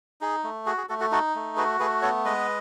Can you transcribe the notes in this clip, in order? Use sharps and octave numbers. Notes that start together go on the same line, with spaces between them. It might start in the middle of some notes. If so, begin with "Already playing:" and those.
D#4 G#4
A3
F#4 G#4
G#4
A3 F#4 A4
F#4 A4
D#4 F#4 A4
A3
F#4 G#4 B4
A3 G#4 B4
B3 A4 C#5
G#3 B4 D#5